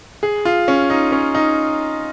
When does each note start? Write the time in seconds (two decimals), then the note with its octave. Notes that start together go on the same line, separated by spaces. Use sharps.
0.23 G#4
0.45 F4
0.68 C#4
0.90 D#4
1.12 C#4
1.35 D#4